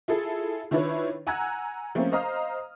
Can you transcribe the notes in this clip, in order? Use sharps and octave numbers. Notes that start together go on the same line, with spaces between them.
E4 F4 G#4 A4
D#3 D4 E4 F4 B4 C#5
F#5 G#5 A#5 E6 F#6 G#6
F3 A3 A#3 C4 C#4
C5 D#5 F5 A#5 D#6 F6